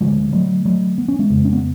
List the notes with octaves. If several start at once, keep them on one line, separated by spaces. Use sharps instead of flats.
D2 D3 F3 G#3
F#3 A3
F#3 A3
B3
C#4
G#3 B3
F2 C#3
C#4
B3